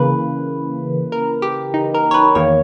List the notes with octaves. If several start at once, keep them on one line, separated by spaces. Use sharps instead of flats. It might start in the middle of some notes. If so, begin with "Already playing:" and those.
Already playing: C#3 E3 A#3 B4
A#4
G4
D#4
A#4
C#5
B4
E2 D#3 A#3 C#5